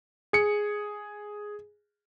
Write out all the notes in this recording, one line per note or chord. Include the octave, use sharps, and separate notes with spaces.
G#4 C#7